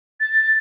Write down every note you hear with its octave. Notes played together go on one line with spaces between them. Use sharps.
A6